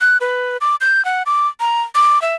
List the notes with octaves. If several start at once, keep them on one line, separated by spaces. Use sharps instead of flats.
F#6
B4
D6
G6
F#5
D6
A#5
D6
E5